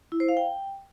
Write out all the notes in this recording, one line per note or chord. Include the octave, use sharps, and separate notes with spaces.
E4
C5
F5
G5